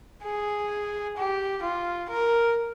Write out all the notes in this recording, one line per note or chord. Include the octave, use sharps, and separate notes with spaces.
G#4
G4
F4
A#4